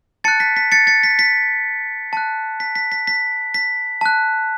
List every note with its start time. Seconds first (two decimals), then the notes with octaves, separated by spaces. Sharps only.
0.24 A5 F#6 A6 C#7
0.40 B6
0.56 B6
0.72 A6 C#7
0.87 A6 C#7
1.03 B6
1.19 B6
2.13 A5 F#6
2.60 B6
2.75 B6
2.92 B6
3.07 B6
3.54 B6
4.01 A5 F#6